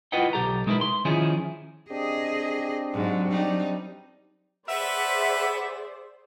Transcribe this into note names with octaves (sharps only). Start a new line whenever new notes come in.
E4 F4 B4 D#5 F#5 G5
B1 G4 A4 A#5
B2 G#3 D#4 E4 A#4 B4
C6
D#3 F3 C#4 D#4 E4 G#4
C4 D4 G4 G#4 D#5
G#2 F#3
G3 D#4
G#4 B4 C5 D5 E5 F#5